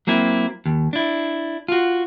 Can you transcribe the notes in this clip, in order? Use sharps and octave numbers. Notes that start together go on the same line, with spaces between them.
F#3 A#3 C4 E4
D#2
D4 E4
F4 F#4